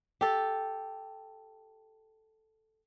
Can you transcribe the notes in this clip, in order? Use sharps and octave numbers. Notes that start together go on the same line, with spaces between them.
G4 A4